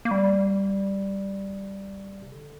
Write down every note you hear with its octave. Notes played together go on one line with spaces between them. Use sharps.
A#3
G3
C3
D3